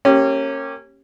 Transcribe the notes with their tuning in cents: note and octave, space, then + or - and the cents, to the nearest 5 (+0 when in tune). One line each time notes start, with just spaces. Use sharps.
A#3 -25 C#4 -20 G4 +0